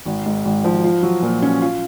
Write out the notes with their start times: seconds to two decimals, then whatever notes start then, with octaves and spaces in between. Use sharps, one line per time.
0.05 G#1
0.26 G#2
0.45 G#1
0.64 F3
0.84 F4
1.03 F#3
1.22 A#2
1.42 C#4
1.62 F4